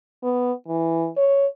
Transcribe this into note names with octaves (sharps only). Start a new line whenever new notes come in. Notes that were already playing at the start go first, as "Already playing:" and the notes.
B3
E3
C#5